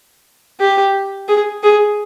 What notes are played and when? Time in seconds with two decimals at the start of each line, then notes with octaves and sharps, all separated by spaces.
0.60 G4
1.28 G#4
1.63 G#4